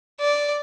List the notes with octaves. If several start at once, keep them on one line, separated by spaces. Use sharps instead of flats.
D5